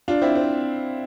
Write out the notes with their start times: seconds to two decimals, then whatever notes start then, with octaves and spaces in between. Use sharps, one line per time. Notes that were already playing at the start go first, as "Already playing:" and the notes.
0.08 D4 F4
0.22 C4 E4
0.36 C4